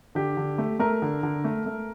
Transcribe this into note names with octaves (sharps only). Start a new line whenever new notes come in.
D3 G4
D3
A3
A3 A#4
D3
D3
A3
A3